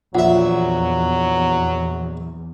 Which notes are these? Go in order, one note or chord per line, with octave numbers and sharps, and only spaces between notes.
A#1 E2 F#3 F4 E5 F#5